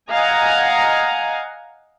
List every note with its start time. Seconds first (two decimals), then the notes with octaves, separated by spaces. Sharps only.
0.11 D#5 F5 F#5 G#5 A#5